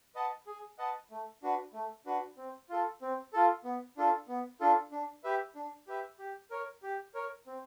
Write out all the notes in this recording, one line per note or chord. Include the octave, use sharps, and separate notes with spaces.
B4 D#5 F#5 A5
G#4
B4 D#5 F#5 A5
A3
D4 F#4 B4
A3
D4 F#4 B4
C4
F4 A4
C4
F4 A4
B3
D4 F4 A4
B3
D4 F4 A4
D4
G4 B4 E5
D4
G4 B4 E5
G4
A#4 C#5
G4
A#4 C#5
C4